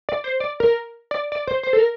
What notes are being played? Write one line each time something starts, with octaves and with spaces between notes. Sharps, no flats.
D5
C5
D5
A#4
D5
D5
C5
C5
A4
A#4